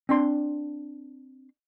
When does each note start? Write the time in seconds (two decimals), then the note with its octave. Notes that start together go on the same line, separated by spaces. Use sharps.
0.09 C4 D4 C6